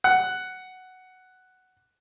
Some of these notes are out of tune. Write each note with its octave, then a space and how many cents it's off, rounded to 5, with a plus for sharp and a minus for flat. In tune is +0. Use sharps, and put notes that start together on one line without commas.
F#5 +5